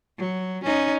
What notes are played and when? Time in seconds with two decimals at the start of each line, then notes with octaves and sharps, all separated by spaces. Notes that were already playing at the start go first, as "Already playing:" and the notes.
0.19 F#3
0.64 C#4 D#4